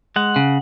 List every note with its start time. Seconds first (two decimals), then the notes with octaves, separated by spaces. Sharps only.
0.16 G#3 F#5
0.36 C#3